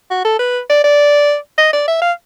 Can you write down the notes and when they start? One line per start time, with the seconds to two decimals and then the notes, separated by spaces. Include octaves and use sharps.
0.10 F#4
0.25 A4
0.40 B4
0.69 D5
0.84 D5
1.58 D#5
1.73 D5
1.88 E5
2.02 F5